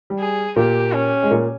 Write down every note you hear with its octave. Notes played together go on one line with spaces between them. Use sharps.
G3
G#4
A#2 A#3 G4
C#4
G#3
A#2 A#3